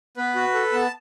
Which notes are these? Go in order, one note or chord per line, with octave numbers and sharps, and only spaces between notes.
B3 B4
F#4
A4
B3 A5